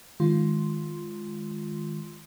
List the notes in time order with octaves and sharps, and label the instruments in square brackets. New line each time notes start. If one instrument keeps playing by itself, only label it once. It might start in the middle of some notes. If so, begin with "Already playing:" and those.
[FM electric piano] D#3 G#3 F4 C6